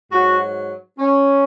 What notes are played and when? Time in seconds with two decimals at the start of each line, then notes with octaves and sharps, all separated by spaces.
0.12 G#2 F#3 F#4
0.99 C#4